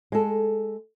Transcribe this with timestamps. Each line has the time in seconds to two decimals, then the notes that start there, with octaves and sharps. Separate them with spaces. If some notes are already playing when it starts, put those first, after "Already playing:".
0.12 G#3 A4